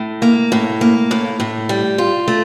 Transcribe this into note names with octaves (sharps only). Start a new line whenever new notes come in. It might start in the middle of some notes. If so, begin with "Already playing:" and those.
Already playing: A2
A#3
A2
A#3
A2
A2
G3
F4
A3